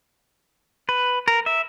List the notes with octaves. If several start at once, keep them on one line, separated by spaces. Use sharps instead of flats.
B4
A#4
E5